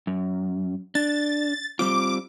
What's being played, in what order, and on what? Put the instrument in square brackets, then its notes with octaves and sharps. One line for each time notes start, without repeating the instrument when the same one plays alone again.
[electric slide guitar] F#2
[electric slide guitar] D4 [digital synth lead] A6
[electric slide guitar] G3 C4 F4 [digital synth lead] D6